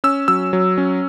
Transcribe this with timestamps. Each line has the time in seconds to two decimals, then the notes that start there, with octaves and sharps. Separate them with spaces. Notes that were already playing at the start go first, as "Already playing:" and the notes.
0.04 C#4 E6
0.28 F#3 E6
0.53 F#3
0.78 C#4